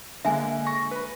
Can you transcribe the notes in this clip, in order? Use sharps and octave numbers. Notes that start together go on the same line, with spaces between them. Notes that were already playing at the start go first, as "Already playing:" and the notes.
D3 G#3 A#3 E5 G#5
C#6 A#6
B4 B5